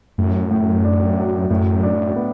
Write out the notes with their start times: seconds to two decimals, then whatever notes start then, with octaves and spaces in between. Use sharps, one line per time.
0.18 F#2 A2
0.51 A2
0.84 D4
1.17 F#3
1.50 F#2 A2
1.83 D4
2.16 B3